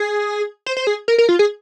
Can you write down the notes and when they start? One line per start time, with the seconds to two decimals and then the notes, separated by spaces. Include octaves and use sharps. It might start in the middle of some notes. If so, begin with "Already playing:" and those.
Already playing: G#4
0.66 C5
0.77 C5
0.87 G#4
1.08 A#4
1.18 A#4
1.29 F4
1.39 G#4